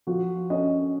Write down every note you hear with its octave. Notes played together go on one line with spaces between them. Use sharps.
F3 F#4
C#4 D#5